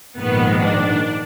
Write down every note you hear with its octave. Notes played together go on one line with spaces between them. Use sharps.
A#1 G#2 D#3 B3
D4